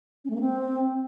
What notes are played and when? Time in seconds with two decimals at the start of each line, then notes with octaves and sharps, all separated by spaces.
0.25 C#4
0.30 A3
0.35 A#3
0.41 C4